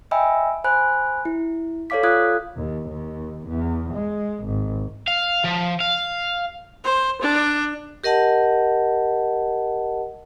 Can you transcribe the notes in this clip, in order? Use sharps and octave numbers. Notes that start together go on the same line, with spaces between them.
D#5 E5 G5 G#5 B5 E6
C5 G#5 B5 F#6
E4
A4 C#5 D5 F5 D6 B6
F4 A4 F5 D#6 F#6 G#6
D#2
D#2
E2
G#3
G#1
F5
F3
F5
C5
D4
G4 A#4 D#5 F#5 A5